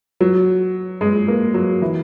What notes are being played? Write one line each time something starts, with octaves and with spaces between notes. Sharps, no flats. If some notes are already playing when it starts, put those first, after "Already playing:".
F#3
G#3
A#3
F#3
E3